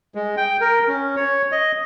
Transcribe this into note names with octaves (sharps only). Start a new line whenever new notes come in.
G#3
G5
A#4
C#4
C#5
D#5